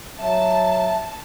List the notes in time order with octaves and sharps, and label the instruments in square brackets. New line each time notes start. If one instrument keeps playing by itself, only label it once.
[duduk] F#3 [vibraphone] E5 [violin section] A5